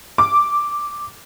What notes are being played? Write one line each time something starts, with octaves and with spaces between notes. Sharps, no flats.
D6